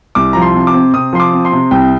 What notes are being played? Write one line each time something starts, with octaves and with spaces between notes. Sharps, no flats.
C2 D6
F3 A#5
C6
C3
D6
C4
C3 D#6
F3 C6
D6
C4
C6
C3
C2 G5